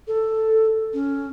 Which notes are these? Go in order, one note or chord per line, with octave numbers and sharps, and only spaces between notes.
A4
C#4